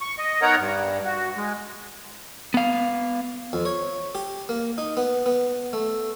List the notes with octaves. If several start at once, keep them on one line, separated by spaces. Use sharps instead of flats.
C#6
D#5
B3 D#4 A#4 C#5 F#5 A#5
G2
F#4
G#3
B3 F5
F2
C#5
G4
A#3
D#4
B3
B3
A3